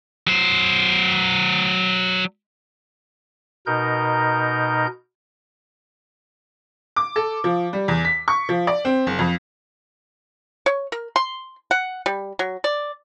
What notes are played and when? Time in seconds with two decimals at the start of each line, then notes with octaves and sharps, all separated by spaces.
0.27 F#3 C5
3.67 B2 D#4 A#4 G6
6.96 D6
7.16 A4
7.44 F3
7.73 G3
7.88 E2
8.05 B6
8.28 C#6
8.49 F3
8.67 D5
8.85 C4
9.07 F#1
9.19 F2
10.66 C#5
10.92 A#4
11.16 C6
11.71 F#5
12.06 G3
12.39 F#3
12.64 D5